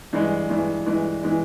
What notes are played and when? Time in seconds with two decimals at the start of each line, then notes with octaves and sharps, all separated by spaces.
0.13 G2 E3 G#3
0.50 G2 E3 G#3
0.86 G2 E3 G#3
1.23 E3 G#3